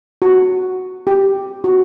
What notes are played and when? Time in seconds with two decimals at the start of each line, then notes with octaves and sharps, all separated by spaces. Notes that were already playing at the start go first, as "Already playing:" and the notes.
0.22 F#4
1.07 G4
1.64 F#4